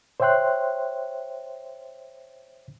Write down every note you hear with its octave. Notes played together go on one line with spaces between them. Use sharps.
C5 C#5 E5 G5 C6 F#6